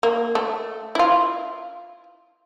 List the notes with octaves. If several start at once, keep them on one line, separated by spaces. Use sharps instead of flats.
A#3
A3
E4 F4